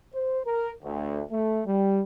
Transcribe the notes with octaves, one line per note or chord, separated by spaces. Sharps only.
C5
A#4
D2
A3
G3